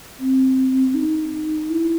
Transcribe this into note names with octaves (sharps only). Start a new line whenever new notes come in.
C4
D#4
E4